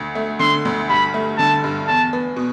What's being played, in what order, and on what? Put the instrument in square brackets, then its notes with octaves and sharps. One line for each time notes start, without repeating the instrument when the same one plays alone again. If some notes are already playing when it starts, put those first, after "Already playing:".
Already playing: [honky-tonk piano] D2
A3
[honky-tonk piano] D3 [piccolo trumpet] C6
[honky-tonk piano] D2
[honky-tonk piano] G2 [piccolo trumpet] B5
[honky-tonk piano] A3
[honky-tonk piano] D3 [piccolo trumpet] A5
[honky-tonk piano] G2
[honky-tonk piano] E2 [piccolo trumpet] A5
[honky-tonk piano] B3
B2